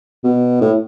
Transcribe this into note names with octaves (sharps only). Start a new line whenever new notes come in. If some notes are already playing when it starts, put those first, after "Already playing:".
B2
A2